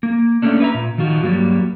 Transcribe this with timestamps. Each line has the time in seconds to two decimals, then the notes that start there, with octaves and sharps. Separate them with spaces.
0.03 A#3
0.42 A3 A#3 C#4 D4
0.60 B4 E5 A#5
0.74 A#2
0.98 D#3 F3 F4 F#4
1.23 G2 F#3 G3 A#3